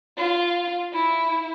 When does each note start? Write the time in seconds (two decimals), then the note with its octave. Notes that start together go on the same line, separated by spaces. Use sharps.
0.18 F4
0.93 E4